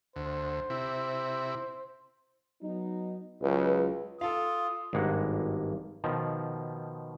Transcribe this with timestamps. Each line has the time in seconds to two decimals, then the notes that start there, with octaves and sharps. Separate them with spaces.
0.16 D2 C5
0.70 C3 E4
2.61 F#3 B3 D#4
3.42 C#2 F#3 F4 B4
4.21 F4 A4 F5 D#6
4.93 G#1 G2 G#3 A#3 F#5
6.04 B2 D#3 F3